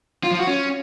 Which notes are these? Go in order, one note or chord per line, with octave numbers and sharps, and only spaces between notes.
F4
F3
F#4
C#4